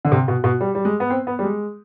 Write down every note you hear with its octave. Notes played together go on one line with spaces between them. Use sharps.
D3
C3
B2
B2
G3
G3
G#3
B3
C4
B3
G3
G#3